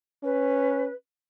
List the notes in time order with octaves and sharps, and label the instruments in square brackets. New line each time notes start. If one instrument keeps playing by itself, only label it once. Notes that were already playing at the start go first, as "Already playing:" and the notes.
[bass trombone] C#4 [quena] B4